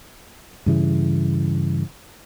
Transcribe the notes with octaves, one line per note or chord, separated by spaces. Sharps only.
G2 C#3 E3